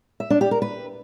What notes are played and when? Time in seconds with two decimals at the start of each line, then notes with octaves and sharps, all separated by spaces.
0.20 E5
0.30 D4
0.41 G4
0.51 A#4
0.62 B4